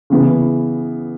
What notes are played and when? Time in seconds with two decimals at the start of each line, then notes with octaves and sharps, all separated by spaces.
0.10 C#3 E3 B3